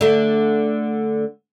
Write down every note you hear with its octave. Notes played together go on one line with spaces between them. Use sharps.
D3 A3